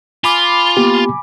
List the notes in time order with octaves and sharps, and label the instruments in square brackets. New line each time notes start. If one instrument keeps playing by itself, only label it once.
[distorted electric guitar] F4 [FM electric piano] G#5 B5 D6
[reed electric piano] A#3 B3 G4